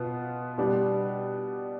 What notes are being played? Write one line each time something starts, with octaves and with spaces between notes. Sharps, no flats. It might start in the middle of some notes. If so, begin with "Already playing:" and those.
Already playing: B2 B3 F4
B2 G3 D4 G4